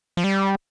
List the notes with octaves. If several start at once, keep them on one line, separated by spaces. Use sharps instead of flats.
F3
G3